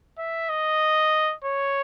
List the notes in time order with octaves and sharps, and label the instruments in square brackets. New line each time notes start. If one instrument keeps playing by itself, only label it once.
[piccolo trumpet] E5
D#5
C#5